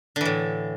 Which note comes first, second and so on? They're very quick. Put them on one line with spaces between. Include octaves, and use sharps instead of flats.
D3 E3 A2